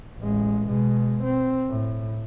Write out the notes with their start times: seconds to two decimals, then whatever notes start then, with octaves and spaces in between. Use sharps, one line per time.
0.19 A1 G#3
0.66 B2 G#3
1.24 C4
1.69 A2